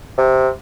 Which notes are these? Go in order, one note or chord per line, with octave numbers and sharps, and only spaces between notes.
C3